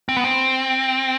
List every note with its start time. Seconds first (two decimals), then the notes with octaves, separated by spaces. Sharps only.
0.09 C4
0.16 B3
0.24 C4